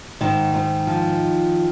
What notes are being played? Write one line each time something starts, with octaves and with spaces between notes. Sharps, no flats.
G#2 D#3 D#4
G#2
F3